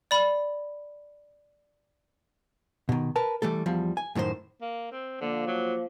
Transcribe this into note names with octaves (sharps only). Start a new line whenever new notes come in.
D5 B5
B2 D#3
A#4 B4 A5
E3 G3 A3 A4
E2 F3 G3
G#5
F#2 A2 D#3 F4 C5
A#3
C4
D3 F3 A#3
F#3